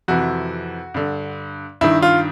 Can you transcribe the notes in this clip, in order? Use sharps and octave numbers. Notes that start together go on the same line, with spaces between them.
F2 C3 E3 F#4
G2 D3
G2 D#3 E4
F4